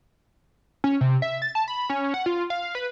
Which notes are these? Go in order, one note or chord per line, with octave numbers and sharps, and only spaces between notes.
C#4
C3
E5
A6
A5
B5
C#4
F#5
F4
F5
B4